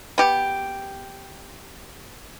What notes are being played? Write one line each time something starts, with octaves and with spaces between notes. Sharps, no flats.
B3 G4